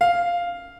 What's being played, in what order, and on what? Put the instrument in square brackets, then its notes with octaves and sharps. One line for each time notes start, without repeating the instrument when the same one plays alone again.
[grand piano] F5